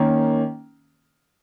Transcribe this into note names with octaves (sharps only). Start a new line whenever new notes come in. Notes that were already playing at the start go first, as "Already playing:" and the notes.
Already playing: D#3 A#3 C#4